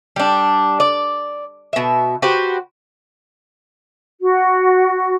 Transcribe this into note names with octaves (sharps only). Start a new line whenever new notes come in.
G3 D4
D5
B2 E5
F#4 G4 B4 C5
F#4